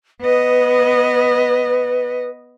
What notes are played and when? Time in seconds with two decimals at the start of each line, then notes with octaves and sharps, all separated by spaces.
0.21 B3 B4 D#5